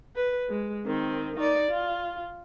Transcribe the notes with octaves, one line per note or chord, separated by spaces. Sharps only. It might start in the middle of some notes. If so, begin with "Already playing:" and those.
B4
G#3
D#3 C4
D#4 D5
F4